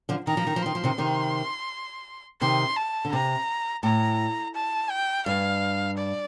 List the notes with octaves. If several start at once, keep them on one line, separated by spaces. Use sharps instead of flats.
D3 F3
D#3 A#5
F3
D#3
F3
D#3 C6
F3
C3 D#3
C3 D#3
C3 D#3 C6
A5
D3
C3 A#5
A2 A#5
A5
G5
G2 F5
D5